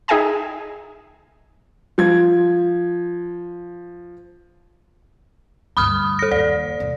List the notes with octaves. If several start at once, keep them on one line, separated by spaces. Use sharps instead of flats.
D#4 G#4 E5 G5 G#5 A#5
F3 G#6
D2 G2 B5 D#6 F6
A4 A#6
F#1 D#2 D5
E2 C3